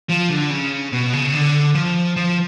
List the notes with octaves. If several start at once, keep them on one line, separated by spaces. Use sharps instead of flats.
F3
D3
C#3
B2
C#3
D3
F3
F3